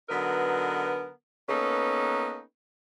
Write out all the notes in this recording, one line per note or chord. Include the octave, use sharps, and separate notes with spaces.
D3 F#3 B3 D#4 A#4 B4
A#3 B3 C#4 D#4 A4 B4